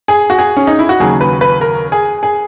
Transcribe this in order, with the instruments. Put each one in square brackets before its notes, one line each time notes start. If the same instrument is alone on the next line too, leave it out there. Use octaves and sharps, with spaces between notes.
[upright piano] G#4
F#4
G#4
C#4
D#4
E4
F#4
D#2 C#3 F#3 G#4
B4
B4
A#4
G#4
G#4